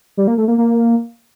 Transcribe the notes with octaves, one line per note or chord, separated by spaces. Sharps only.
G3
A#3
A3
A#3
A#3